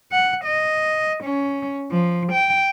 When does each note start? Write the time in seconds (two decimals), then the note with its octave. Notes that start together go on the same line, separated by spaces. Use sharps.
0.12 F#5
0.45 D#5
1.24 C#4
1.91 F3
2.32 G5